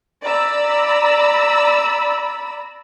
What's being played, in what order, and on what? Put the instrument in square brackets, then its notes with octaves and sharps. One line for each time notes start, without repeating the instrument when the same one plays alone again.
[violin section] D5 A#5 B5 E6